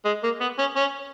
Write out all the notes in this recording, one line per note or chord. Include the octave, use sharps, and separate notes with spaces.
G#3
A#3
B3
C#4
C#4